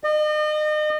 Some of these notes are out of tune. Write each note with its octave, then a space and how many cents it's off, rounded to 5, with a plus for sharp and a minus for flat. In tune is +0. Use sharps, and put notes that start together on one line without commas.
D#5 -40